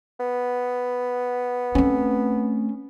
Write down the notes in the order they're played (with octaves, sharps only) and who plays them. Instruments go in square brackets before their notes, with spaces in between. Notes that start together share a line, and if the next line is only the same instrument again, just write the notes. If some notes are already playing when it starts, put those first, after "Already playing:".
[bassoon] B3
[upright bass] A3 C4 [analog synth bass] C#4